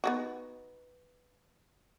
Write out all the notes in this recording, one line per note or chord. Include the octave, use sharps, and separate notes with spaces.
B3 D#4 F#4